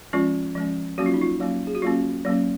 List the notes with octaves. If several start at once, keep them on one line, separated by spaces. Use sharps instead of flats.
F3 G#3 C#4 F4
F3 G#3 C#4
F#3 A#3 C#4 F#4
F4
D#4
F4
F#3 A#3 C#4
G#4
F#4
F#3 A#3 C#4 F4
F#3 A#3 C#4